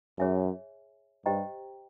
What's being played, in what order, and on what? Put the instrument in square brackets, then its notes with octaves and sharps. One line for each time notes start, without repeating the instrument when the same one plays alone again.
[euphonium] F#2 [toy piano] G#4 C#5 E5 G#5
[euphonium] G2 [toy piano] G4 C5 D#5 G5 A#5